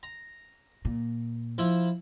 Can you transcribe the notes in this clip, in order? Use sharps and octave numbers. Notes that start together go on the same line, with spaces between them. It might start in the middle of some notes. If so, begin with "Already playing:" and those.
A#5
A#2
F3 E4 F4